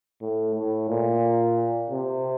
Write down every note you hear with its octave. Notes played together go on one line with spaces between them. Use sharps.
A2
A2
A#2
C3